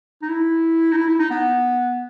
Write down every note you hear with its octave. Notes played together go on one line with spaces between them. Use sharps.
D#4
E4
D#4
E4
E4
D#4
B3